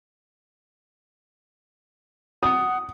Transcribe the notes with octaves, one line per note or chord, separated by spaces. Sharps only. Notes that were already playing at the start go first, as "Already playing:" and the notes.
F#5 D#6